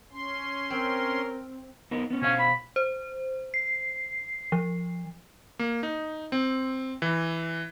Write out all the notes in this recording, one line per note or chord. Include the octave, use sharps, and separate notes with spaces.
C#4 C6
C4 A#4
B3 D#4 A#4
B3 C#4
B2 C#4 C5 F5
B5
C5
C7
F3
A#3
D#4
C4
E3